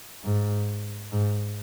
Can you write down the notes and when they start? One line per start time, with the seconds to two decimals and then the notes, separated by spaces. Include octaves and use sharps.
0.24 G#2
1.12 G#2